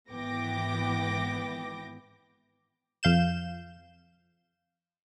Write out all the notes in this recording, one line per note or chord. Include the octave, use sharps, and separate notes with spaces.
G#1 E3 B3 G5 D6 A#6
F2 F5 G6 E7